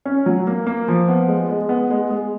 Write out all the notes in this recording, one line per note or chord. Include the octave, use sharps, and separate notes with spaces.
C#4
F#3
A#3
A#3
F3
B3
G#3
G#3
B3
G#3
G#3